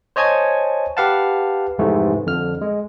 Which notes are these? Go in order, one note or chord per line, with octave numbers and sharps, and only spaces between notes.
C5 C#5 D#5 G#5 A5 G#6
G4 B4 F5 F#5 A5
F2 G#2 C3 E3 A3
F2 D3 F6
G#3